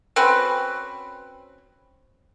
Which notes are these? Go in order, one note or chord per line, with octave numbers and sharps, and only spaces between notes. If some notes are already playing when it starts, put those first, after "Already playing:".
C4 C#4 F#4 B4